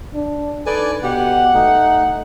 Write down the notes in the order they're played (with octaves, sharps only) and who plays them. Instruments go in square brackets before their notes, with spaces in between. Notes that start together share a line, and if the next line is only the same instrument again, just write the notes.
[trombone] D4
[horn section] D#4 D5 [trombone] A4 [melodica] B4 G#5
[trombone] B2 [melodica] G4 [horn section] F#5
[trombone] A3 [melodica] D#4